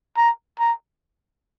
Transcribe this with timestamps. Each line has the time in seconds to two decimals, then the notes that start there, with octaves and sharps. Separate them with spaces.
0.17 A#5
0.59 A#5